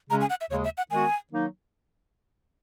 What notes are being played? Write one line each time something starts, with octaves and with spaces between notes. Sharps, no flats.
C#3 G#3 C#4 A#5
G#5
F#5
E5
D#2 C#3 G#3 C#5
E5
F#5
D#3 G#3 B3 F#4 G#5
D#3 F#3 A#3 D#4